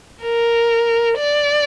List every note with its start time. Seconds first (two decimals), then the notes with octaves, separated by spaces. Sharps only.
0.23 A#4
1.18 D5